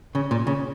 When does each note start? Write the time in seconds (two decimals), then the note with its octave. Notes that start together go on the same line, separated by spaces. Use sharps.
0.15 C#3
0.31 A#2
0.47 C#3